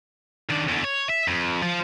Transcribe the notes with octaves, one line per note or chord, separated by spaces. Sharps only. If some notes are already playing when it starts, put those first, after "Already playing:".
D#3 D4
E2 D3
C#5
E5
F2
F3